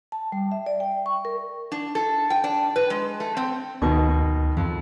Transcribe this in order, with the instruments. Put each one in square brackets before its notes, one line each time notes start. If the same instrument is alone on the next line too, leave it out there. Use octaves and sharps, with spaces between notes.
[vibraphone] A5
G3
E5
D5
G5
C#6
A#4
[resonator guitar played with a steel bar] D4
A4
G5
D4
B4
G#3
A3
C4
[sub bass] D2 [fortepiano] B2 D#3 [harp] C#6
[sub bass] D2
[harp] F2 [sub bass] E3